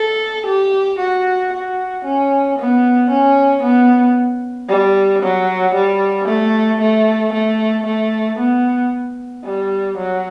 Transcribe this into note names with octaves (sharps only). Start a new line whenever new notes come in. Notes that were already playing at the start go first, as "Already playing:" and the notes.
Already playing: A4
G4
F#4
F#4
C#4
B3
C#4
B3
G3
F#3
G3
A3
A3
A3
A3
B3
G3
F#3